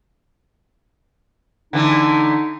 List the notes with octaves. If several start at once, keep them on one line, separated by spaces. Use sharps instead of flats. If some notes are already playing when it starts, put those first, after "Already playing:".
D3 E3 A3 D#4